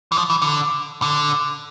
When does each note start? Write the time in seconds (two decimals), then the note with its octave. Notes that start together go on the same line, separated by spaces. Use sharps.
0.12 E3
0.17 F3
0.30 E3
0.42 D3
1.02 D3